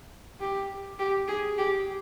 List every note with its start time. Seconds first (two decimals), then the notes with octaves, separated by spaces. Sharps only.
0.40 G4
0.99 G4
1.28 G#4
1.58 G4